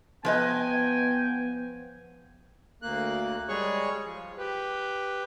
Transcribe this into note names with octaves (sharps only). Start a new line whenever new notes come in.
F3 B3 B4 D#5 G5 G#5
D2 A#3 F#6
G3 G#3 G#4 C#5 C#6
F3
G4 B4